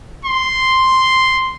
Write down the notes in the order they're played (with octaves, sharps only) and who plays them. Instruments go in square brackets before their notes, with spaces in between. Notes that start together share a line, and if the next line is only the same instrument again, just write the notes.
[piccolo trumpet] C6